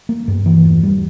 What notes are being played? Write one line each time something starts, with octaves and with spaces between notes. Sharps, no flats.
A#3
G2
E3
E1
G3